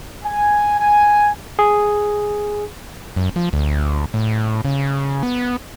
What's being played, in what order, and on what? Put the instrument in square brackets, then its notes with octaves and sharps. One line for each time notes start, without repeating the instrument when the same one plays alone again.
[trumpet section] G#5
G#5
[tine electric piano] G#4
[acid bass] F#2
F3
D2
A2
C#3
B3